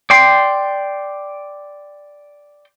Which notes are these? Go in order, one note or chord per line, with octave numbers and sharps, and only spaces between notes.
D5 G5 C6